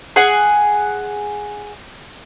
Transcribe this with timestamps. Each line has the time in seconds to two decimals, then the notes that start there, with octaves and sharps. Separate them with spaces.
0.16 G#4 F#5